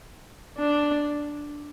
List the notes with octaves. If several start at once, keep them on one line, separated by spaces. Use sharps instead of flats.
D4